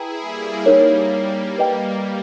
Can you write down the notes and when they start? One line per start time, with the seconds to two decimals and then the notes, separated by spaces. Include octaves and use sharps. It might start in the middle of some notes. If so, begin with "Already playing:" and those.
Already playing: E4 G#4 B4 G5 A#5
0.19 G3 A#3
0.65 G3 A#3 D#4 A#4 C#5
1.59 B4 D#5 G5